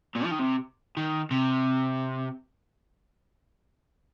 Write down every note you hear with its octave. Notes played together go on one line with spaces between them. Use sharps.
A#2
F3
D#3
C3
D#3
C3